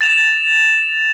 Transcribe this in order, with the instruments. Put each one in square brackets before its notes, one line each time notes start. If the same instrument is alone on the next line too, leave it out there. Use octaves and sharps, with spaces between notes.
[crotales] A6 E7 F7